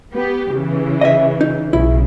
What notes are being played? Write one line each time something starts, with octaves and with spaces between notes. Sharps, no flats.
B3 G4
C#3 E3
D#5 E5
D#4
B1 C#3 E4